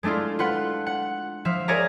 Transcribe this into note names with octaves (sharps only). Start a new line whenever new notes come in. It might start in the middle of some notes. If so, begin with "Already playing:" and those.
G#3 A3 D4 E4 F4
F4 B4 F#5
F#5
F3 E5 F5
G#4 A#4 C#5 D5 E5 A#5